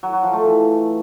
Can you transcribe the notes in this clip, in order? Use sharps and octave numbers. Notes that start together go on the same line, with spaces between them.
F#3
F#3
F3
A3
E3